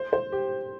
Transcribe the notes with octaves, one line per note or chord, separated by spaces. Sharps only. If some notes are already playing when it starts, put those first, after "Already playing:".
Already playing: C5
C5
G4